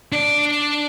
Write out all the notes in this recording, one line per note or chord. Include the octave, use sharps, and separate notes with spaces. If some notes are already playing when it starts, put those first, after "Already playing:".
D4 D5